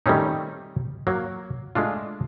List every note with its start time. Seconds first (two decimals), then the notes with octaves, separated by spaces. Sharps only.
0.06 D#3 G3 A3 C4 C#4 D#4
1.07 F#3 A#3
1.75 G#3 A3 D4 F4